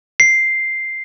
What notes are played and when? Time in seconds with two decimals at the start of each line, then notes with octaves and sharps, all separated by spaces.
0.20 C7